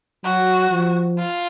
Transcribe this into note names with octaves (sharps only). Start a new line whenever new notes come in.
F#3 F#4
F3
F4